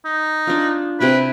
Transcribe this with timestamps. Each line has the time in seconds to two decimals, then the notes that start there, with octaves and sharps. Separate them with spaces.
0.05 D#4
0.47 D4 F4
1.00 C3 C4 E4 B4